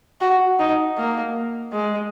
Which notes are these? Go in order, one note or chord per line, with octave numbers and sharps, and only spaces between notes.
F#4
D#4
A#3
G#3